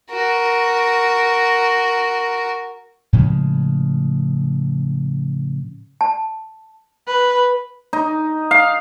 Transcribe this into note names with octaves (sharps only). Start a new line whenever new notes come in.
F#4 A#4
A2 C#3 F3 G#3
A5
B4
D#4
F5